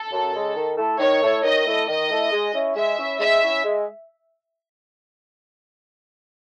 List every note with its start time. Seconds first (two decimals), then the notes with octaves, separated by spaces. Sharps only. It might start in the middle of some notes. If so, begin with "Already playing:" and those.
Already playing: A4
0.12 F#2
0.34 C#3 G#3
0.56 D#3
0.78 A3 E4 A4
1.00 D#3 C#5
1.22 A3 E4 A4
1.44 D#3 D#5
1.66 A3 E4 A4
1.88 D#3 D#5
2.10 A3 E4 A4
2.32 G#3
2.55 C#4 E4
2.76 G#3 E5
2.99 C#4 E4
3.20 G#3 E5
3.43 C#4 E4
3.64 G#3